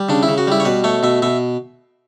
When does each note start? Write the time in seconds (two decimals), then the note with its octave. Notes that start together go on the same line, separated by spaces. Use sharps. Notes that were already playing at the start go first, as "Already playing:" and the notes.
Already playing: G3
0.09 C#3 D4
0.23 E4
0.28 C#3
0.38 F#4
0.47 G3 E4
0.60 C#5
0.65 B2 B4
0.84 A3 C#5
1.03 B2 E5
1.22 B2 E5